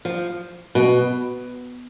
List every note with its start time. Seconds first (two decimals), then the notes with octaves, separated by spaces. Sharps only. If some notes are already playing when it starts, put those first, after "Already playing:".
0.05 F3
0.75 B2